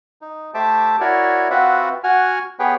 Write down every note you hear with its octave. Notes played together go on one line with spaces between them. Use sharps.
D#4
A3 G4 C5 E5 A5 D6
E4 F#4 A#4 C#5 D5
C4 F4 F#4 B4 E5 F#5
F#4 F#5 G#5 F6
B3 G4 G#4 B4 C#5 G5